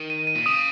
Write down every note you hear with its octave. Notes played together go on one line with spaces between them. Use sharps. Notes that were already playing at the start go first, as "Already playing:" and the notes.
Already playing: D#3
D#7
D#7
A#2
C#3 D#6